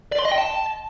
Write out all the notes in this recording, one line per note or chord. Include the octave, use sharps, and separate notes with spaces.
D5
C6
D#5
G5
A5